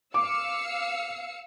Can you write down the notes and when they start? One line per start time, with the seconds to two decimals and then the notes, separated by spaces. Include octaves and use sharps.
0.14 F5 D6 E6 C#7